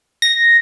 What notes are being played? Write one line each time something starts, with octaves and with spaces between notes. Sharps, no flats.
A#6